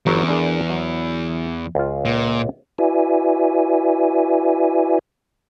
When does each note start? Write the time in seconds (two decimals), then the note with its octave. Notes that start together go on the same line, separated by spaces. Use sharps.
0.06 G1 E2 F#3
0.28 D4 G#4 A#4
0.70 F#3
1.75 C#2 F4
2.05 A#2
2.78 E4 F#4 B4 D5 E5 G#5